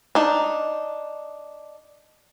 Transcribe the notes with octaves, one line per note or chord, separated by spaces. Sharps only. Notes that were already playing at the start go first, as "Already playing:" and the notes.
D4 D#4